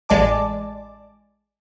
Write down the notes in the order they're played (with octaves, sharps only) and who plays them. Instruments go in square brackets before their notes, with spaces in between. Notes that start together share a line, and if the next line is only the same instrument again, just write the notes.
[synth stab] A1 G#3 D5 A5 D6